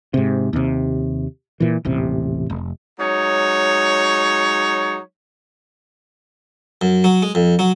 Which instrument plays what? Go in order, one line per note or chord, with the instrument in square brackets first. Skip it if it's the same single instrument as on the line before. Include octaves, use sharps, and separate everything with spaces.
[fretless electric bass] G#2 C3
D#2 C3
A#2 E3
D#1 A1 C3
F1
[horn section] F#3 G#3 D#4 C#5
[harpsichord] F#2
F#3
G#3
F2
F#3